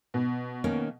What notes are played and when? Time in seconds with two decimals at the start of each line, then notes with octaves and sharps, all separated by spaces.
0.14 B2
0.64 D#3 A#3 C#4